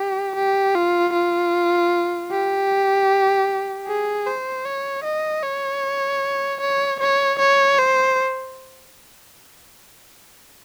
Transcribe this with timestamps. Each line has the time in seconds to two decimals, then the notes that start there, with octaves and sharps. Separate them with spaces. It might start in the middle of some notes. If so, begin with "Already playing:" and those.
Already playing: G4
0.36 G4
0.75 F4
1.13 F4
2.31 G4
3.87 G#4
4.27 C5
4.65 C#5
5.04 D#5
5.44 C#5
6.61 C#5
7.00 C#5
7.39 C#5
7.79 C5